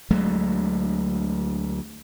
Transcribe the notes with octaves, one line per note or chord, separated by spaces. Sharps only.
D2 F#3 G#3 A3